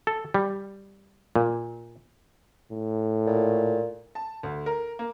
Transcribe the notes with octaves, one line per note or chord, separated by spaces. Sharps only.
A4
G3
A#2
A2
A#2
A5
D2
A#4
A#3